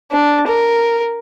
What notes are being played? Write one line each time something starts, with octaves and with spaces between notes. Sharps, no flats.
D4
A#4